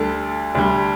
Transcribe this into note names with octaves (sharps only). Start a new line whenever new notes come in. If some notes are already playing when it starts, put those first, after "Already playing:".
Already playing: D2 D3 G3 A4
D2 D3 G3